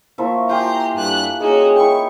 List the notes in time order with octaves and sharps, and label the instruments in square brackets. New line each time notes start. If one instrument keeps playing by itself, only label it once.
[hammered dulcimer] F3 A#3 E5 [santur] A3 E4 C#6
[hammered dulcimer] F4 G4 [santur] G5 G#5 [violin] A#5 C6
[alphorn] G2 [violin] A3 F#6
[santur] G#3 A#3 D#4 [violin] C#4 F#4 [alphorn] G#4
[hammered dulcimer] E4 C#5 G5 [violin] C#6